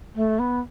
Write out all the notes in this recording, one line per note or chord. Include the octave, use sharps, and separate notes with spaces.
A3
B3